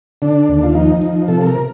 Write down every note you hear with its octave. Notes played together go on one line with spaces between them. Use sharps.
D3 D4
D#2
F4
F3 D#4
F3
C3 A4
A4
A#4